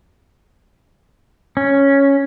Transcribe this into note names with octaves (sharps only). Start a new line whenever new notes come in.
C#4